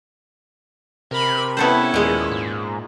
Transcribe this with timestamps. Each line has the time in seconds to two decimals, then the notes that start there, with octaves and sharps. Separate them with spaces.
1.11 C3 A#4 B5
1.57 B3 C#4 E4 A4 C5
1.94 D#2 A#2 G#3
2.32 G#2